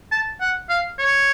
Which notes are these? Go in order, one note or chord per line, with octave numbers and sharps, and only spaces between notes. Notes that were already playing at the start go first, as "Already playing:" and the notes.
A5
F#5
F5
C#5